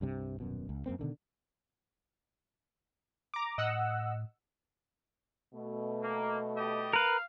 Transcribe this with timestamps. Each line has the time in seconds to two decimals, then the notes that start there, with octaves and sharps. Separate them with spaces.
0.01 C2 G2 C3
0.40 D#1 F#2 B2
0.69 C#2
0.86 F#2 A#2 A#3 C4
0.99 B2 D3 D#3
3.34 A#5 D6
3.58 A2 D#5 F#5 E6
5.53 B2 A3
6.03 A#3
6.57 G3 G4 D#5
6.93 A#4 B4 F5